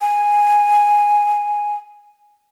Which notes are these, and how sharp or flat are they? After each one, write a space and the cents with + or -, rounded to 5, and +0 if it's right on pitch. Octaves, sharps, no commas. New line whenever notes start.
G#5 -5